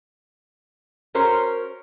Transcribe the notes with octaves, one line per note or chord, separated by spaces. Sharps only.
C#4 F#4 A#4 C5 C#5